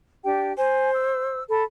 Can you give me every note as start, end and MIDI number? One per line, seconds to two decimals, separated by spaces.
0.24 0.53 62
0.24 0.53 67
0.24 0.53 79
0.58 1.40 72
0.58 0.90 80
0.93 1.44 88
1.50 1.64 69
1.50 1.64 83